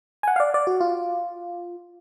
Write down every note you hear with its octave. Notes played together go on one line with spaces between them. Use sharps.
G#5
F#5
F5
D5
D5
F#4
F4